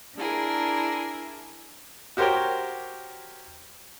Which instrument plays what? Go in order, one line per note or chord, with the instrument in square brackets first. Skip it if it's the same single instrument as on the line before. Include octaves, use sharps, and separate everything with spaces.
[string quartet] D4 E4 G#4 A#4
[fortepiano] F#4 G4 A#4 C5 C#5 G5